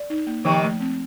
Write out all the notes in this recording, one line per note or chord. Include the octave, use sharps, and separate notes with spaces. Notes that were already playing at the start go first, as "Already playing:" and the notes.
Already playing: D5
D#4
A#3
C3 D#3 F3
A3
C4